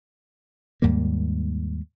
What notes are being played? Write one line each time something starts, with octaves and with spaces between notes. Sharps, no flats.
D#2 G#2 G3 A#3